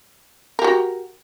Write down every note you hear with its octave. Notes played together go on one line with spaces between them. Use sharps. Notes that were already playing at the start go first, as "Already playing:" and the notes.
F#4 G4 A#4